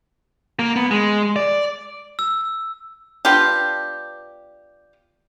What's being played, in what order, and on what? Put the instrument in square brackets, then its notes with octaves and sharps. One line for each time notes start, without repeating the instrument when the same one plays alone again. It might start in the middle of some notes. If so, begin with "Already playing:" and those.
[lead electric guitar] A#3
B3
G#3
D5
[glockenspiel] E6
[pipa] B3 D4 F4 G4